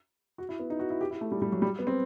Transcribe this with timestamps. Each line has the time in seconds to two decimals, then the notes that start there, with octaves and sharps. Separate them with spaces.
0.38 F#4
0.49 E4
0.59 B3
0.70 D#4
0.79 F#4
0.90 E4
1.01 G4
1.11 E4
1.21 A3
1.32 G3
1.42 G3
1.52 F#3
1.62 G3
1.79 B3
1.87 C4